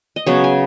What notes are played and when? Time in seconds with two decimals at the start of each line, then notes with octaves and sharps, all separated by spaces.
0.16 D#5
0.26 C#3 F#3 B3 C#5
0.44 G#5